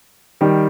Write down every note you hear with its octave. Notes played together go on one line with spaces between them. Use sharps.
D#3 G3